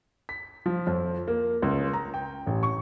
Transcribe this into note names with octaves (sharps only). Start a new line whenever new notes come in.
B6
F3
F2
A#3
C#2
A#5
G5
A1
C#6